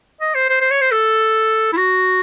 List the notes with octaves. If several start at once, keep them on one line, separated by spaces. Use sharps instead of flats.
D#5
C5
C5
C5
C#5
C5
A4
E4
F#4